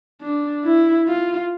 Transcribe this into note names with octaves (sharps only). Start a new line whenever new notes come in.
D4
E4
F4